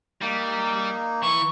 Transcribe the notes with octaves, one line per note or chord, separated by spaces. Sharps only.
G3 A#3 D#4
E3 C#6